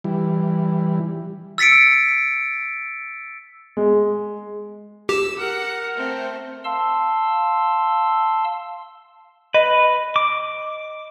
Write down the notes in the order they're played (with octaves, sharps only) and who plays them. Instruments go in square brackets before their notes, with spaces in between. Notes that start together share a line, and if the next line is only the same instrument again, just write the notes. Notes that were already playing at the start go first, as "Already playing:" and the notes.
[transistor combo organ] E3 G3
[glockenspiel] E6 A6 B6 C#7 D7
[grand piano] G#3
[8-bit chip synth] G4 [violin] E6
[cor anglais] A#4 [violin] F#5
[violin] A3 C4
[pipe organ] F5 A5 C6 E6
[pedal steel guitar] B4 [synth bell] D#5
[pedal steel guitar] D6